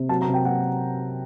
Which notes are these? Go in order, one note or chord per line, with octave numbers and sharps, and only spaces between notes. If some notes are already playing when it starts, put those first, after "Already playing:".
Already playing: C3
F#3 A5
A#5
C3
G5
F#3 F#5